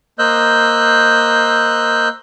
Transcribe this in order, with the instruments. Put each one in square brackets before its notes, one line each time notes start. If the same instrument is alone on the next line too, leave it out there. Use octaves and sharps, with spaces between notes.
[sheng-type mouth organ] A#3 C5 D#5 E6 F#6 G6